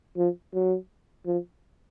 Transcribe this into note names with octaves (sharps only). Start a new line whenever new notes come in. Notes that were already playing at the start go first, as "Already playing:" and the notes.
F3
F#3
F3